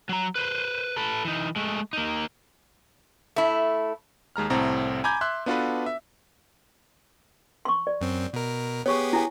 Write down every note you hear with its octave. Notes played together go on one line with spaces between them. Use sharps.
F#3 A#5
B4 C5
A4 B4
E3 D#4
G#3 A3
A#3 D#4
A3 E4
D#2 G#3 A#5 F6
C2 A2 C4 A4 A#5
G#5 A#5 B5 D6 G6 G#6
E5 C6 E6 F#6
B3 D4 F4 F#4 A4 B4
E5
C6 C#6
D5
F#2 C4
B2 A#4
B3 G4 G#4 C#5 C#6
E4 G#5